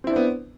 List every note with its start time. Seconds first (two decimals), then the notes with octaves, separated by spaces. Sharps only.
0.04 C4
0.07 E4
0.10 D4
0.13 C5
0.16 B3